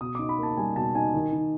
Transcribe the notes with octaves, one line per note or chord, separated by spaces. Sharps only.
B2 D#6
D#4 D6
B5
A#3 A5
G3 G#5
B2 A5
D#4 G#5
D#3
D#3